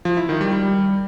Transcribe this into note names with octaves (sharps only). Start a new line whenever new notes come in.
F3
E4
D#3
G3
G3